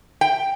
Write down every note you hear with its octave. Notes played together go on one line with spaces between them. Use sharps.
G5